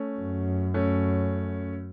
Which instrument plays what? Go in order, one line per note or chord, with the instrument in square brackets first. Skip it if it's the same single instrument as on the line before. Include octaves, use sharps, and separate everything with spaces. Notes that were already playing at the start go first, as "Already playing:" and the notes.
Already playing: [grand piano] A3 C#4
[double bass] F#2
[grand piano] A3 C#4